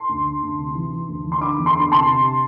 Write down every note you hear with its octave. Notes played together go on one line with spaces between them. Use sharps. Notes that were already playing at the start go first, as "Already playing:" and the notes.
Already playing: A5 C6
D2
D3
D2
C3
E3
E3
D2
E3
C6
D3 B5 D6
E2
C6
D3 B5
C3 A5 C6
C3